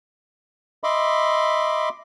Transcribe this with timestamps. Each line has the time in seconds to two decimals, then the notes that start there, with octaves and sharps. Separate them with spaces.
0.84 D#5 E5 B5 C6 D6